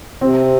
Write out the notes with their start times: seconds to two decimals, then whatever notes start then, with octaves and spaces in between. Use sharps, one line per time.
0.21 C3 C4